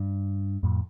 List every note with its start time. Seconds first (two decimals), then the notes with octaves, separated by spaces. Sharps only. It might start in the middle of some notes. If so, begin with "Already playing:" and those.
Already playing: G2
0.63 F2 A2